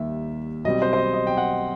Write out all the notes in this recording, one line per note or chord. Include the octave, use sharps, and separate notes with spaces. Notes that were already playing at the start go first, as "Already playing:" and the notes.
Already playing: D#2 D#3 G3 E5
B1 B2 G3 C4 D#5
C5
C5
D#5
D#5
G5
F#5